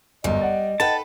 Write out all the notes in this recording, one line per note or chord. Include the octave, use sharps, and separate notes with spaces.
G1 F#2 G3 D#5
D5 F#5
D#4 A4 B4 F#5 G5 A5